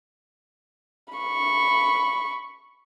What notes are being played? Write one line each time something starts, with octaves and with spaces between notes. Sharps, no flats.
B5 C#6